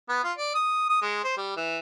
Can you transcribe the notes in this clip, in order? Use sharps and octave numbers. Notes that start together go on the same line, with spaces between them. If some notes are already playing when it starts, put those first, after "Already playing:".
B3
F4
D5
D#6
D#6
G#3
C5
G3
E3